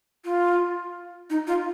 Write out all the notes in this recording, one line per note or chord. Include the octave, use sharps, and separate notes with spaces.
F4
D#4
F4